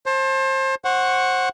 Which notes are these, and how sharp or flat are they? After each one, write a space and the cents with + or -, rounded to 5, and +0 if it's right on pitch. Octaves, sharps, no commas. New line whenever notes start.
C5 +30 A5 +0
C5 +25 F#5 +0 C#6 +0